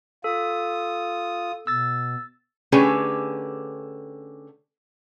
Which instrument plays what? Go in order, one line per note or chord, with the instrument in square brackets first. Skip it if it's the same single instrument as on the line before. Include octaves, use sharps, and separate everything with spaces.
[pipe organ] F4 D#6 [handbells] A4
[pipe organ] B2 [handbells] E6 A6
[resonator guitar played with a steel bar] D3 A3 C#4 G4 G#4 B4